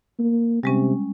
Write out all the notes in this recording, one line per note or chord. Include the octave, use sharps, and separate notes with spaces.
A#3
C3 G3 G#3 C#4